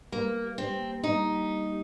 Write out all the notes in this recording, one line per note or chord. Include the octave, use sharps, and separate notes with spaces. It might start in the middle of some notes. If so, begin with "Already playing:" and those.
G3 A#3
G4
C4
A#3
G3 D#4
G3
G4